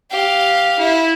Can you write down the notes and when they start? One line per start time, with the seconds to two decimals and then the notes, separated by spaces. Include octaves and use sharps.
0.11 G4 F5
0.79 E4